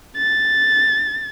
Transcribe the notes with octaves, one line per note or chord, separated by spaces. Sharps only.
A6